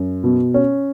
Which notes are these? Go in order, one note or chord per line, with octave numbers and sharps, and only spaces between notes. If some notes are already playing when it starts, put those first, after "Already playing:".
Already playing: F#2
B2
C#4